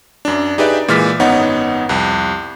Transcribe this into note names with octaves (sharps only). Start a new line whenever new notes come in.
F#2 D4
D#4 G4 G#4 B4 D5 E5
A#2 E3 G#3 F6 A6 B6
G#1 F#2 B3 D#4 C#5 F#5
C2 F2